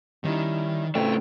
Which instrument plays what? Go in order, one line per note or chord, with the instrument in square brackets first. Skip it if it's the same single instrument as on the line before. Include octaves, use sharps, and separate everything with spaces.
[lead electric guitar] D#3 [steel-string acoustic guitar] G3 C#4 E4
[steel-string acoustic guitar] A2 C4 [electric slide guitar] C#3 A3 [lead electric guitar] G5